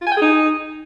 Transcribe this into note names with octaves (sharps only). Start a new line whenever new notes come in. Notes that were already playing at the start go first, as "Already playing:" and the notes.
F4
G#5
G5
G#4
D#4